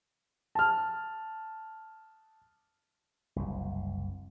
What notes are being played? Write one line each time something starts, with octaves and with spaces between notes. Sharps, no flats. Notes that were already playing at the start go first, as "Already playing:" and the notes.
A5 F6
F#1 C2